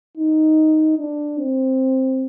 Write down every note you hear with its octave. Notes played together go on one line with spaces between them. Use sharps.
D#4
D4
C4